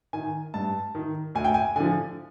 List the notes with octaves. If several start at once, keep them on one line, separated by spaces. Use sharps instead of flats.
D#3 G#5
G2 A5
D#3
D2 G#5
G5
G#5
D3 F3 G#5